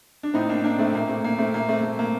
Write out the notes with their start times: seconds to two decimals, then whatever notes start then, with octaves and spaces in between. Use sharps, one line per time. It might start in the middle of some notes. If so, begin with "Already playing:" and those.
0.23 D4
0.34 A2 C4 D#4
0.49 A#3 D4
0.64 A#3 D4
0.78 A3 C4
0.94 A#2 A#3
1.09 A3 C4
1.24 A#3
1.38 A3 C4
1.54 A#2 A#3
1.69 A3 C4
1.83 A3
1.99 A#3